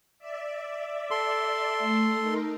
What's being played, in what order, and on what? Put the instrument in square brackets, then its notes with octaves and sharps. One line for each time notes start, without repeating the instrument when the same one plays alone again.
[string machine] D5 E5
[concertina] A4 C6
[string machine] A3
D#4 A#4